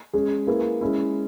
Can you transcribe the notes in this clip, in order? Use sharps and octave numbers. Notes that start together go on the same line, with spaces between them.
G#3 C#4 G#4
A#3 E4 G#4 B4
G#3 C#4 E4